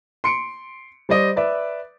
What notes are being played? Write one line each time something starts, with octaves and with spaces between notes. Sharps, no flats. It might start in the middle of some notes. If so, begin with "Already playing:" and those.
C6 C#7 D7
G3 C5 D5 D#5
B4 D5 E5